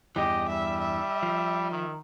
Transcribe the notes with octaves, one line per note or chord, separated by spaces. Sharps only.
E2 G2 E3 G4 D#5
G3 E5
E5
F3
D#3